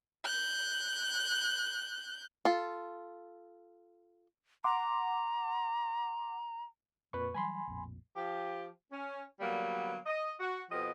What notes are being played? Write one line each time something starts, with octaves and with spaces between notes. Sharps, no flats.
F#6 G6
F4 A4
F#5 A#5 C6 D6
F2 A#2 C4 B4 C#6
E3 F#3 G3 G#5 B5 C6
A#1 F2 A2
F3 G4
C#4
D3 F#3 G3 A#3 B3
D#5
F#4
F2 B2 F3 G4 D#5